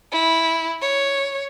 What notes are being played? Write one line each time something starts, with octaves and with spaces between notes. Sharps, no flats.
E4
C#5